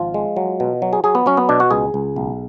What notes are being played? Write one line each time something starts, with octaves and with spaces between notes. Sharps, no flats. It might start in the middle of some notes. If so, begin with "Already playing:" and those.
Already playing: G#1 F3 F4
G#3
F#3
B2
F#3
G#4
F#3 G#4
B3
F#3 C#4
B3
B2 D4
F#4
C#2 G#4
C#2
B1